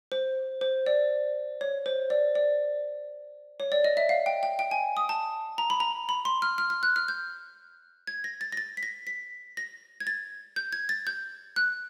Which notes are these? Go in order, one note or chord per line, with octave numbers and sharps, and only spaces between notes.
C5
C5
D5
C#5
C5
D5
D5
C#5
D5
D#5
E5
F5
G5
G5
G5
G#5
D#6
A5
A#5
B5
A#5
B5
C6
F6
F6
F6
F#6
F6
G6
G#6
A#6
A6
A#6
A6
B6
A#6
B6
A#6
G#6
A6
G6
G#6
A6
G6
F#6